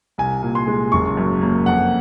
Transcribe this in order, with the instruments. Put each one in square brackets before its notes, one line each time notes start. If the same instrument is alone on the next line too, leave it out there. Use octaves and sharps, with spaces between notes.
[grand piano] C2 G#5
A#2
C6
G#3
F#1 C#6
F#2
A#3
F2 F#5